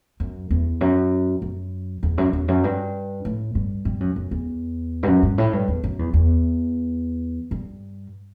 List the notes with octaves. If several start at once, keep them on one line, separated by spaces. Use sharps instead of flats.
F#2
E2
F#2
F#2
E2
F#2
E2
F#2
G2
A2
G2
G2
F#2
F#2
E2
G2
F#2
G2
A2
G2
E2
F#2
E2
E2
G2